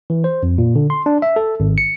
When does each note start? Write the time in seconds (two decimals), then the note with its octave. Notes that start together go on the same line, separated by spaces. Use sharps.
0.10 E3
0.24 C5
0.43 F2
0.58 A#2
0.76 D3
0.90 C6
1.06 D4
1.22 E5
1.36 A4
1.60 G#1
1.78 C#7